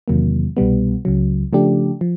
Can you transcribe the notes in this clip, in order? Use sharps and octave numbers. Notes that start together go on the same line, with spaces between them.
E2 C3 D#3 F#3 A#3
C2 B2 G3 B3
C#2 C#3 F#3
C#3 F3 A3 D4 G4
F3